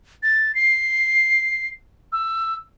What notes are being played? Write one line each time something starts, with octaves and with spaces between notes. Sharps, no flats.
A6
C7
E6